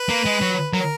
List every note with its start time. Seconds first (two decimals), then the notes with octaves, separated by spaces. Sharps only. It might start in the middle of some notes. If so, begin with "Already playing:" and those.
Already playing: B4
0.09 A#3
0.26 G#3
0.41 F#3
0.73 F#3 A#4